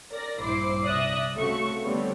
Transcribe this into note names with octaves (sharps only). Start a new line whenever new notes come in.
A#4 D5 A#6
A#1 G2 E4 C5 D6 C7
C2 D5 E5 D#6 F#6 A#6
C#3 A3 C4 F#4 E5 C#6
D3 G3 A3 B3 C4 C#5